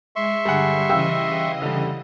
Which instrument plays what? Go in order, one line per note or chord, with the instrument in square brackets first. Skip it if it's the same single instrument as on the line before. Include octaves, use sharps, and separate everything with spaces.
[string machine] G#3 [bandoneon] E5 C6 C#6
[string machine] G2 D3 [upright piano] G3 G#4 F#5
[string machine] C#3 E3 D#5 [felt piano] F5 G5 E6
[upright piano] D3 G3